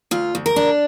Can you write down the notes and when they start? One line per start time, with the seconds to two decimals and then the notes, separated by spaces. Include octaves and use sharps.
0.11 D2 F4
0.35 D2
0.46 A#4
0.56 D4